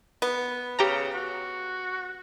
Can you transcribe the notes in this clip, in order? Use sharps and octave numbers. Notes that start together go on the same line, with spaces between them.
B3
C#3 G4 A#5
F#4